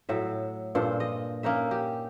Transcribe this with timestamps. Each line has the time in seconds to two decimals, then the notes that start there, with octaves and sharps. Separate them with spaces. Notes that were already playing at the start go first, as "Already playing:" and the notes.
0.09 A2 F#3 E5
0.75 G2 A#2 A4 C5
1.00 D#5
1.43 A#3 C#4 D#4 E5
1.71 G4